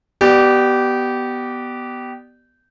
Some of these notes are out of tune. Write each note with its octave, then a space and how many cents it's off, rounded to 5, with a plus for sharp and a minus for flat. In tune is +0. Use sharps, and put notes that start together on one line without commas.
B3 +0 G4 -20 D5 +20